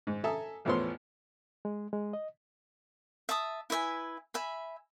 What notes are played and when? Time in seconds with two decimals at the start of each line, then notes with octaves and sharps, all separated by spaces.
0.07 G#2
0.24 A4 E5 G#5 A#5 D#6
0.65 A1 E2 F3 B3 C#5 C6
1.65 G#3
1.93 G#3
2.13 D#5
3.29 E5 A5 D#6
3.70 E4 B4 E5 G#5
4.34 E5 G#5 B5